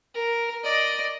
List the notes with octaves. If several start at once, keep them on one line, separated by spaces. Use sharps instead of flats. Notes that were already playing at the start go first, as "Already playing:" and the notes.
A#4
D5 D#5